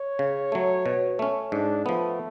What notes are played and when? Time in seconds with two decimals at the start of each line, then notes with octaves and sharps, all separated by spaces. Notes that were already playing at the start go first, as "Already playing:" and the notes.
Already playing: C#5
0.19 C#3
0.52 F#3 A3
0.86 B2
1.19 A3 C#4
1.51 G#2 D4
1.85 F3 A3 B3